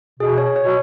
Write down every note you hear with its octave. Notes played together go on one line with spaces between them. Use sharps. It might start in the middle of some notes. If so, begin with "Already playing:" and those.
B2 G#4
C#5
C#5
B2